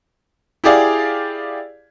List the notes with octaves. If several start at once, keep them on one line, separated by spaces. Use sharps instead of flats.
E4 G4 G#4 D5 F5